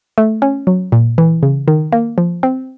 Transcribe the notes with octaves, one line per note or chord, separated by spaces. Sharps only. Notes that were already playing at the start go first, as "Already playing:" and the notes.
A3
C#4
F#3
A#2
E3
C#3
D#3
A#3
F3
C4